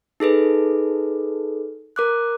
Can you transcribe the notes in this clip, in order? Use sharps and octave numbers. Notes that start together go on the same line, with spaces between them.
D#4 G#4 A4 B4
A#4 D6 F#6